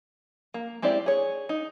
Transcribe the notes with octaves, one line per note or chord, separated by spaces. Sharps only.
A#3
G#3 C4 E4 G4 D5
G#4 C#5
D#4